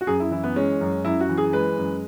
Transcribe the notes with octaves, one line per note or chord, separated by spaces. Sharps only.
F#4
F#2 G#4
E4
E3 E4
B3
G#3 C#4
F#2
F#2 E4
F#4
E3
G#4
G#3 B4
F#2